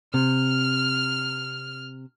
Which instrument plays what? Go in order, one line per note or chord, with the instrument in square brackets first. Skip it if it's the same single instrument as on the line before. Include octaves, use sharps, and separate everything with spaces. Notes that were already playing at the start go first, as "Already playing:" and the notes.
[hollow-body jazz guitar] C3 [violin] F6